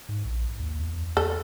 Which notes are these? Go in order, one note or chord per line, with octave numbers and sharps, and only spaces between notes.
G#2
A#1
D#2
E2
E2 A4